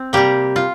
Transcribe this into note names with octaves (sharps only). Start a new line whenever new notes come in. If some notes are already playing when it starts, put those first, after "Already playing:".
Already playing: C4
C3 G3 A#3 G4
F4